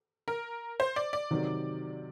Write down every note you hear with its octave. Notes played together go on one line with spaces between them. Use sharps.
A#4
C5
D5
D5
C3 D#3 F#3